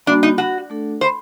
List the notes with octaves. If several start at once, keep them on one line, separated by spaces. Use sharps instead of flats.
G3 A#3 D4 F#4
D#4
F#4
A3 D4 A4
C5